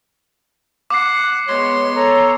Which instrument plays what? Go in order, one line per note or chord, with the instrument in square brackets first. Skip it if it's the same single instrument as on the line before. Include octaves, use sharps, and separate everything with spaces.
[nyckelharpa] F#5 [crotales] D6 C7
[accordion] G#3 C#5 [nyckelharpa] B3 C6
[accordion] A4 C#5 A#5